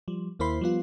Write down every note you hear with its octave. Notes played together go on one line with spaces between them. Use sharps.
F3 G3
D#2 A#3 E4 C5 B5 C7
F3 G3 B3 F4